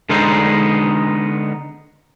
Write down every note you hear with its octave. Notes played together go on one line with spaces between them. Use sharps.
D3 G#3 B3 D4 D#4 C5